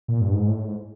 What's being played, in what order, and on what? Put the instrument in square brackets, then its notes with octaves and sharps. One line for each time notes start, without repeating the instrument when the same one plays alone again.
[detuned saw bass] A#2
G2
G#2
A2
G#2